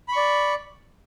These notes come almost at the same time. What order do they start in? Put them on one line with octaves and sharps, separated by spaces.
B5 C#6 D5